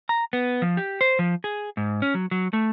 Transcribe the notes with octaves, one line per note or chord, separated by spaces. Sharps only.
A#5
B3
F3
G4
C5
F3
G#4
G#2
C#4
F#3
F#3
A3